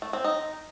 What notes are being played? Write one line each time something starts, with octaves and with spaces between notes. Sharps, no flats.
A3
C4
D#4